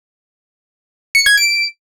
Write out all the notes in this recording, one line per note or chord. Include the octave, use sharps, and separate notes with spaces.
C#7
G#6
D7